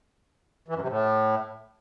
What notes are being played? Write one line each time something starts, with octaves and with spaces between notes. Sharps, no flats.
E3
F#2
C3
A2